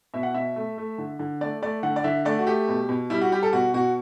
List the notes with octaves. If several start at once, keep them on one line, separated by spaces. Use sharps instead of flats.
B2 E5
F#5
B2 E5
A3
A3
D3
D3
A3 D5
A3 D5
D3 F#5
D5
D3 E5
A3 D5
F#4
A3 G4
B2
B2
G3 E4
F#4
G3 G4
A4
B2 F#4
B2 F#4